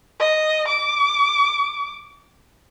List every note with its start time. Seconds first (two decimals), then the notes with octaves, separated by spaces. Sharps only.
0.20 D#5
0.68 D6